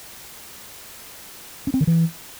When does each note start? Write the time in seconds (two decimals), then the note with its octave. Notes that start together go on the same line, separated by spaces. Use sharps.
1.67 C#4
1.74 C4
1.81 D#3
1.87 E3